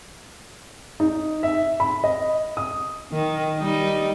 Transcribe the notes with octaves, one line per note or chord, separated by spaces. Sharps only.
D#4
E5
B5
D#5
D#6
D#3
G3 D#4